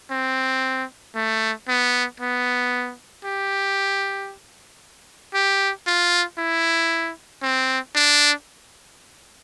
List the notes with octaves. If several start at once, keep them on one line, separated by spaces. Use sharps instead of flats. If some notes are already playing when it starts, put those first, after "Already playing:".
C4
A3
B3
B3
G4
G4
F4
E4
C4
D4